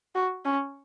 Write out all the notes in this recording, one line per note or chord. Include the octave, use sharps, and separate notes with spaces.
F#4
C#4